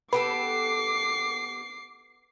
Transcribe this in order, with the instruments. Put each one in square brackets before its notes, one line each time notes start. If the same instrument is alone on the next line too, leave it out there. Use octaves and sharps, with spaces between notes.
[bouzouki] B3 G4 A4 [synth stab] B4 [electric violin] D6 C7